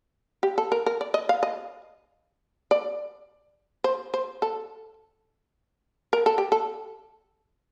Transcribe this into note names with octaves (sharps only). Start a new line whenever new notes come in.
G4
A4
A#4
A#4
D5
D#5
F5
D#5
D5
C5
C5
A4
A#4
A4
G4
A4